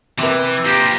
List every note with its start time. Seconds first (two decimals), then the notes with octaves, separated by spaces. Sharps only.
0.19 C3 E3 B4
0.65 F3 A#3 G4